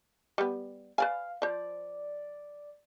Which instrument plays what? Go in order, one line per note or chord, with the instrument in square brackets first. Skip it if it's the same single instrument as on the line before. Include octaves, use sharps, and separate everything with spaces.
[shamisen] G3 B3
[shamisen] B4 D5 G#5 [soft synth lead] F5
[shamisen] F3 C5 [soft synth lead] D5